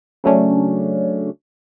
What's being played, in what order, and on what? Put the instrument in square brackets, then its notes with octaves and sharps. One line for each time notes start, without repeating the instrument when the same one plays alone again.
[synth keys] C#3 F#3 A3 C#4 D4